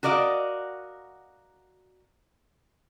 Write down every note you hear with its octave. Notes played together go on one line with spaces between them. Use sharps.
F#4 A#4 D5 D#5 F5